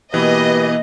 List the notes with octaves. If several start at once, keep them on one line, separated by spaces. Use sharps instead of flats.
B2 E3 A#3 G4 B4 D#5